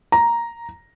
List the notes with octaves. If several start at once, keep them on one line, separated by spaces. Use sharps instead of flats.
A#5